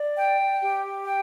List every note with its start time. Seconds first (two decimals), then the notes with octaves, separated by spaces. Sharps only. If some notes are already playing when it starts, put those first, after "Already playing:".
Already playing: D5
0.17 G5
0.61 G4
1.06 G5